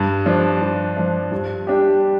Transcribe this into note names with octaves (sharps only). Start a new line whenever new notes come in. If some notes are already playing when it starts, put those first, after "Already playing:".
Already playing: G2
F3 D4
G2
F3 D4
G2
G3 D4 G4